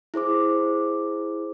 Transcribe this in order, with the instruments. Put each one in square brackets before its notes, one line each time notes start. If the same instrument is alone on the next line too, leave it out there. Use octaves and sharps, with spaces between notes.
[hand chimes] E4 G#4 C5 D6